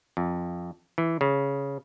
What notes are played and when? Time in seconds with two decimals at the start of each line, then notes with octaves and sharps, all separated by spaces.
0.17 F2
0.98 E3
1.21 C#3